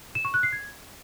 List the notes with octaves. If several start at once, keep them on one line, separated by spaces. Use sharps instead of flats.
E7
C#6
F#6
C7
G#6